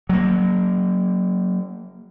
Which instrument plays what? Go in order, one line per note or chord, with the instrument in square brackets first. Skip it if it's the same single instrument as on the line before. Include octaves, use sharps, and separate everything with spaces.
[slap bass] F#3 A#3